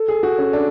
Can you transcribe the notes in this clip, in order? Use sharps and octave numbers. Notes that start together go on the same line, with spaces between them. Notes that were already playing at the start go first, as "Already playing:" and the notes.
Already playing: A4
G#4
F#4
C#4
D4